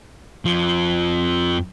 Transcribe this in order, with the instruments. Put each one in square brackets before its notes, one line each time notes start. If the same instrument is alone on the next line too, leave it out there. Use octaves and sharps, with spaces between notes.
[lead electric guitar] F2 F3